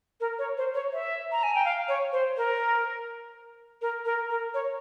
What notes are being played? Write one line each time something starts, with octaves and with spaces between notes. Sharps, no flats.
A#4
C#5
C5
C#5
E5
A#5
G#5
G5
F5
C#5
C5
A#4
A#4
A#4
A#4
C#5